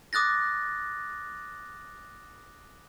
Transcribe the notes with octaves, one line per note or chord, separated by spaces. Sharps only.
D6 D#6 F#6 A6 A#6